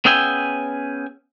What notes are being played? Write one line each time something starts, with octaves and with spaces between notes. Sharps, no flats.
B3 C#4 G#4 E5 G5 G#5